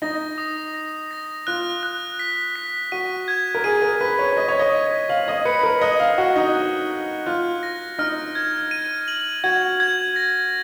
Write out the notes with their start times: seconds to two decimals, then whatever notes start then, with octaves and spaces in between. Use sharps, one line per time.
0.02 D#4 A#6
0.38 D#6
0.74 A#6
1.11 A#6
1.47 F4 F#6
1.83 F#6
2.19 B6
2.56 B6
2.92 F#4 D#7
3.28 G#6
3.55 A#4
3.64 G#4 D#7
3.82 A#4
4.00 B4 B6
4.19 C#5
4.37 D#5 B6
4.48 C#5
4.59 D#5
4.73 B6
5.09 F5 F#7
5.28 D#5
5.45 B4 C#7
5.63 A#4
5.81 D#5 F#6
6.00 F5
6.18 F#4 F#6
6.36 D#4
6.54 F#6
6.90 F#6
7.26 F4 F#6
7.63 A#6
7.99 D#4 F6
8.35 G#6
8.71 D#7
9.08 F#7
9.44 F#4 G#6
9.80 G#6
10.16 A#6